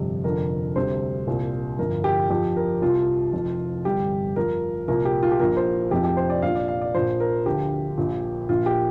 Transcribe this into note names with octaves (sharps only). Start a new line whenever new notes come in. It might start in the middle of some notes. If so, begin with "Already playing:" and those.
Already playing: G1 F2 C3 G3
F1 F2 D3 F3 A#4
D2 C3 G3 C5
C2 A#2 G3
G1 F2 F3 A#4
G4
F2 F3 G4
A#4
C2 C3 F3 F4
F1 F2 F3
G1 G2 G3 G4
F2 F3 A#4
C2 A#2 F3 A#4
G4
F4
G4
A#1 A#2 F3 A#4
C5
F1 F2 C3 F3 G4
G4
C5
D5
A#1 A#2 F3 F5
D5
F5
D5
A#1 A#2 F3 C5
A#4
D2 D3 F3 G4
A#1 A#2 F3
A#1 A#2 F3 F4
G4